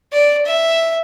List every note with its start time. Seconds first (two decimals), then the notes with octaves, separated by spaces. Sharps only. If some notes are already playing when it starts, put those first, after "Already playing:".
0.13 D5
0.47 E5